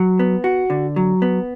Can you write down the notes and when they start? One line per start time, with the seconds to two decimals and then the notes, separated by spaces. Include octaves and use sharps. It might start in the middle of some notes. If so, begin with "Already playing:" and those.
Already playing: F#3
0.19 B3
0.44 F#4
0.70 D3
0.96 F#3
1.22 B3